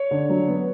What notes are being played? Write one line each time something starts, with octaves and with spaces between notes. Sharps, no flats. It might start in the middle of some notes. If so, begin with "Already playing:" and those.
Already playing: C#5
D3
F#3
B3